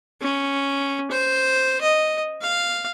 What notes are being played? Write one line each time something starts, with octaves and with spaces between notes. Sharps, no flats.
C#4
C5
D#5
F5